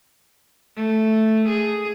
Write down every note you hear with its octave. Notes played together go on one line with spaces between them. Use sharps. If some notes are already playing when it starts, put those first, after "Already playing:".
A3
G#4